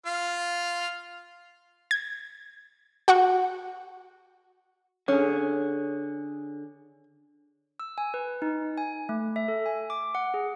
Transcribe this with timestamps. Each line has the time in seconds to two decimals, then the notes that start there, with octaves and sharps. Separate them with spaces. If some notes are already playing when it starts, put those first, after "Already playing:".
0.06 F4 F5
1.91 G#6
3.08 F#4 F#5 C#6
5.08 D3 C#4 G#4
7.80 E6
7.98 G#5
8.14 B4
8.42 D#4
8.77 G#5
9.09 A3
9.36 E5
9.48 A4
9.66 G#5
9.90 D6
10.15 F#5
10.34 G#4